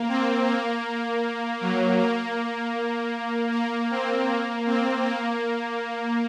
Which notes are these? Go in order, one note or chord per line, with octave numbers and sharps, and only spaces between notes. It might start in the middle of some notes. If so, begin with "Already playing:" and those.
Already playing: A#3
C4
A#3
F#3
A#3
A#3
C4
A#3
C4
A#3